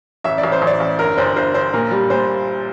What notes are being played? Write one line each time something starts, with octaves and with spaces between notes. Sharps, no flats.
A1 E5
D5
A1
C5
A1
D5
A1
G1 A#4
G1 C5
G1 C5
G1 C5
A#2 A#4
G3
A#2 C5